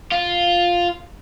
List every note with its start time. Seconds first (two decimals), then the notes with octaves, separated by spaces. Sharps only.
0.12 F4